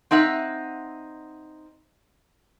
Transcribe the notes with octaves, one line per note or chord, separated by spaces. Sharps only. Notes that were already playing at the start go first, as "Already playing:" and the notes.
C4 D#4 E5 F#5